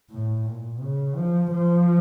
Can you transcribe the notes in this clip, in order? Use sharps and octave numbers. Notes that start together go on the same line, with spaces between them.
A2
A#2
C#3
F3
F3